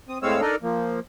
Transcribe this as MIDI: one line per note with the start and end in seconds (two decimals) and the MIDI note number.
0.09 0.18 60
0.09 0.18 87
0.22 0.41 45
0.22 0.41 56
0.22 0.41 60
0.22 0.41 73
0.22 0.41 77
0.22 0.41 88
0.41 0.56 62
0.41 0.56 63
0.41 0.56 69
0.41 0.56 70
0.41 0.56 74
0.41 0.56 75
0.63 1.00 53
0.63 1.00 58